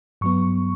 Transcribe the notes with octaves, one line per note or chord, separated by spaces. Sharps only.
G2 F#3 B3 C#6